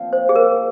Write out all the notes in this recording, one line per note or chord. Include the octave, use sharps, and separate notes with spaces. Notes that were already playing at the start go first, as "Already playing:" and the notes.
Already playing: A#2 F3 C4 F4
C5
G#4
A#4